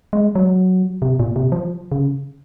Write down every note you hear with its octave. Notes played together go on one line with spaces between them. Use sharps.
G#3
F#3
C3
A#2
C3
F3
C#3